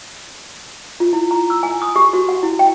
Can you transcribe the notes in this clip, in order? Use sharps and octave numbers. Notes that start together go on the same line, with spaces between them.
F4
E4
A#5
E6
G#5
D#6
G4
F#4
F#5
E4
G5